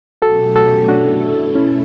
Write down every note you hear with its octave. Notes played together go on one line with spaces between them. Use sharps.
B2 F#3 A3 C#4 F#4 G4 A4
F#4 A4
B2 A3 D4 E4 F#4 A4
C#4 E4